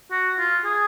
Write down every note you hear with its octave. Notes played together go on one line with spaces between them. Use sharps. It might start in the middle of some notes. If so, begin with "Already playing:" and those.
F#4
F4
G#4